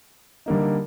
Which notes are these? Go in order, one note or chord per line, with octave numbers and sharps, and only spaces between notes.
D3 G3 A#3 D#4